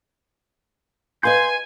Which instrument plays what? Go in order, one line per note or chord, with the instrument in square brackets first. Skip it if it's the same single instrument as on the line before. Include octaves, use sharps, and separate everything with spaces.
[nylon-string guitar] F4 B4 D#5 [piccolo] G#5 [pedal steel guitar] C6 G6